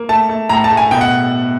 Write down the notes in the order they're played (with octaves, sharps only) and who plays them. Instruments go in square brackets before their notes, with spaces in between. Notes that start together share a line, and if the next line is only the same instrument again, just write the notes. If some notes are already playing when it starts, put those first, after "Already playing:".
Already playing: [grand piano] A#3
A3 A5
A3
A2 A#5
A5
A3
G#5
B2 G5
F#5